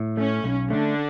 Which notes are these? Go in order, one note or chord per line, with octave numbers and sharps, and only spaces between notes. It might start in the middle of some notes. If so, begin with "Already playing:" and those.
Already playing: A2
A3 C#4
B1
D3 A3 D4